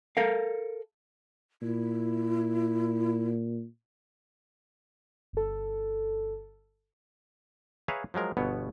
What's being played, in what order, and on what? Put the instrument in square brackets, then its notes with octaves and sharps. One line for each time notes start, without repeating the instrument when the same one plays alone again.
[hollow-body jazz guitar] A4 A#4 F5
[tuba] A#2 [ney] E4
[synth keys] G1 A4
[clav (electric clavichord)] G#4 B4 C#5 E5 F5 A#5
F3 F#3 G#3 A#4
G1 B2 B3 C#5